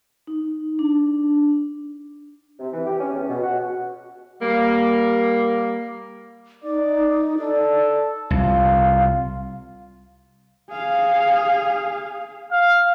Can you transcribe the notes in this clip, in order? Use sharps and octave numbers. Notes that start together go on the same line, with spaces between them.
D#4
D4
C3
E3
G4
C#4
E2
B2
F#4
G3 A#3
D#4 D5
A4 D5
C2 F4 F5
G#4 F5
F5